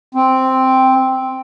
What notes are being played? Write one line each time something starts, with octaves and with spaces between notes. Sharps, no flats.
C4